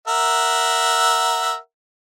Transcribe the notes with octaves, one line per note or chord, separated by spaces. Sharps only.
A#4 E5 F#5